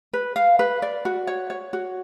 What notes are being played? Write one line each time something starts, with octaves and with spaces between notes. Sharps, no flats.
B4
F5
B4
D5
F#4
C#5
C#5
F#4